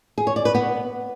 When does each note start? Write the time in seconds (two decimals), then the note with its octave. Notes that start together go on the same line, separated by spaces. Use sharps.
0.18 G#4
0.27 C#5
0.36 D5
0.45 B4
0.55 B3